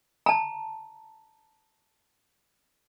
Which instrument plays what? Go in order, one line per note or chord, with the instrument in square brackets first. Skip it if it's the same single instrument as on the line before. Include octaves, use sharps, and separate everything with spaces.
[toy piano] A5 A#5